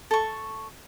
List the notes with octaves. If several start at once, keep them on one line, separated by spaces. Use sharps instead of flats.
A4 C#6